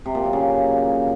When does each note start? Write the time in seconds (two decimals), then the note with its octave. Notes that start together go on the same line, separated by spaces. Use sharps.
0.06 C3
0.15 A#2
0.24 F#3
0.33 C#3